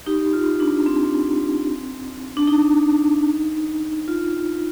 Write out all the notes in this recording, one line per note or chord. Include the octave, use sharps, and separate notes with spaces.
D#4 G4
F4
D4
C4
D4
D#4
F4